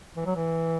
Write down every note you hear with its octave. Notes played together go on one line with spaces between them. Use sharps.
E3
F#3
E3